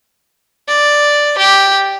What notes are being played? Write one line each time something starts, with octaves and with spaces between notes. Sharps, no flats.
D5
G4